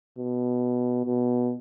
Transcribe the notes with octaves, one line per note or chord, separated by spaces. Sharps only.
B2
B2